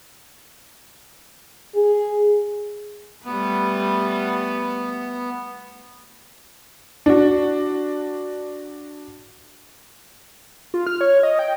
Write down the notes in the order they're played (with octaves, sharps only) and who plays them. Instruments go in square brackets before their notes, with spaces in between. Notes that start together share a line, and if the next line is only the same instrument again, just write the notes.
[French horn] G#4
[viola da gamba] G3 A3 B4 [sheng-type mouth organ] B3
[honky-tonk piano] D4 F#4
[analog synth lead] F4
F6
C#5
D#5
G5